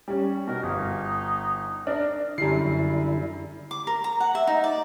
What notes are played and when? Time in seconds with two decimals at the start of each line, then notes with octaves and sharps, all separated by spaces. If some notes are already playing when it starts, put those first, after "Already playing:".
0.08 G3 C#4
0.48 B2 A#4
0.63 G1 D#4
1.87 D4 A#4
2.38 F#2 D3 G3 E4 C7
3.71 D6
3.87 A#4
4.04 A#5
4.20 F#5
4.35 E5
4.47 D#4
4.64 D5